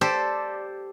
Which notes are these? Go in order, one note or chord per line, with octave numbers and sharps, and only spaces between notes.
G4 A4 C5 D5